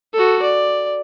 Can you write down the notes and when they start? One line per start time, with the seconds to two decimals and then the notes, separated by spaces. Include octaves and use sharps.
0.13 F#4 A4
0.42 D5